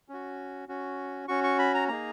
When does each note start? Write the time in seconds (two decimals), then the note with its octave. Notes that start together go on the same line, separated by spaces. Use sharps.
0.09 C#4 F#4
0.69 C#4 F#4
1.28 C#4 F#4 C#6
1.44 C#6
1.59 B5
1.74 A#5
1.88 A#3 D#4 G#4 A#5